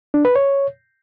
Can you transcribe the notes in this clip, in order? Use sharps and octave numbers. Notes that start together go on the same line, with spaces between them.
D4
B4
C#5